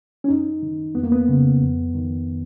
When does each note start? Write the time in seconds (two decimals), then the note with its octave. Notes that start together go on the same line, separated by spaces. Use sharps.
0.24 C#4
0.28 F#2 D#4
0.62 D#3
0.95 F2 B3
1.03 A#3
1.12 B3
1.28 C#3
1.62 F2
1.94 D#3